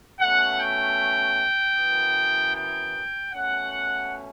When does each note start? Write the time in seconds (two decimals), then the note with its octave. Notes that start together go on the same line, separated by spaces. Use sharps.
0.19 B2 A3 C#4 F#5
0.58 G5
1.76 F#2 E3 B3
2.54 G5
3.32 B2 A3 C#4 F#5